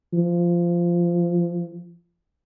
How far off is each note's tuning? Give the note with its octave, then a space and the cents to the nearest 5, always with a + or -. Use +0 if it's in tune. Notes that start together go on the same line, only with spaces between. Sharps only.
F3 -15